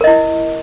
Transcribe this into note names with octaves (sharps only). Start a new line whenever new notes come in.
E4 A#4 D#5